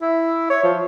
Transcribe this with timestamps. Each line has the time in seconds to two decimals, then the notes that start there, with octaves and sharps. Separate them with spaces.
0.01 E4
0.50 C#5
0.63 F3